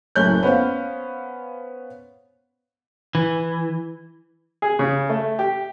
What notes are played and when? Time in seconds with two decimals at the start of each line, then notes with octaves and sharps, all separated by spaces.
0.16 F#1 F#2 A2 C#4 F#6 G6
0.43 B3 C#4 C5 F5
3.15 E3
4.62 G#4
4.79 C#3
5.09 A3
5.39 G4